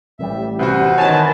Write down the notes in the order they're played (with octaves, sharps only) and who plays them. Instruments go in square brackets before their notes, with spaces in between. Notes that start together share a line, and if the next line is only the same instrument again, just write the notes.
[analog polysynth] A1 G3 [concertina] E5
[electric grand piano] C2 F#4 [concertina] B3 B4 C5
[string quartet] D#3 E3 [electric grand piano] C#5 G#5 [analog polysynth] A5